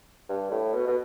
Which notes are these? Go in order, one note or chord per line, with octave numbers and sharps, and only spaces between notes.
G2
A2
B2
B2